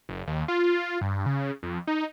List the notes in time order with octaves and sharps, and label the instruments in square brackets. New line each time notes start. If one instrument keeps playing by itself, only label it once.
[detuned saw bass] F#1
D#2
F4
G2
C#3
F2
D#4